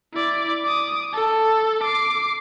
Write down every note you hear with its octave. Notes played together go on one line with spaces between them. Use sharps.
E4 D5
D6 D#6
A4
D6 C7